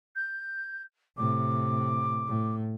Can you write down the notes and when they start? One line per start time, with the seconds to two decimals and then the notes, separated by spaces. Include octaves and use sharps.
0.16 G6
1.17 A2 C3 D6
2.27 A2